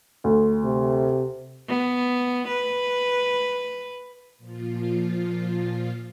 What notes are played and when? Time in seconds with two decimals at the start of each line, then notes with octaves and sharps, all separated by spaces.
0.24 D2
0.64 C3
1.68 B3
2.48 B4
4.38 A#2 F3 F4